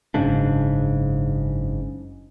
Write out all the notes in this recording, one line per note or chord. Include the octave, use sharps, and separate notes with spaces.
F#1 G#2 C#3 D4